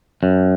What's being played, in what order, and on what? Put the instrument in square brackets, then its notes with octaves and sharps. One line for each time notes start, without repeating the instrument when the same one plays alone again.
[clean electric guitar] F#2